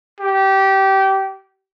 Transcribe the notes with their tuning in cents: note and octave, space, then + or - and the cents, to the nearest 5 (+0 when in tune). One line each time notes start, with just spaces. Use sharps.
G4 -20